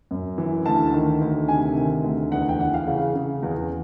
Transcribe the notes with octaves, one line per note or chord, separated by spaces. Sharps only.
F#2
E3
D2 A5
D#3
D2
C3 G#5
D#3
D2
E2 F#5
G5
E3 F#5
F5
C#3
C#3
E2